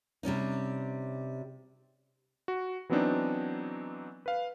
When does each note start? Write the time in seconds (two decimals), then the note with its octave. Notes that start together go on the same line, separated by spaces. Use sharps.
0.23 C3 G3 C#4 D#4
2.48 F#4
2.89 E3 F#3 B3 C4 D4 D#4
4.26 B4 F5